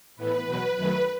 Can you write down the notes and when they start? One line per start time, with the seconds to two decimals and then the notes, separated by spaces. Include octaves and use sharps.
0.16 A2 E3 B3 B4
0.45 E2 B2 F#3 B4
0.74 F#2 D#3 F#3 A3 B4